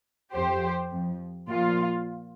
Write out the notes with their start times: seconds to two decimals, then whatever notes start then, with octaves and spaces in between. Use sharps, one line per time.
0.33 F2 F3 G4 C5
0.91 F2 F3
1.49 A#2 F3 F4